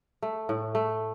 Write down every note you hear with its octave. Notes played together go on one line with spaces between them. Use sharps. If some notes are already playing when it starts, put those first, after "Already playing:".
A3
A2
A3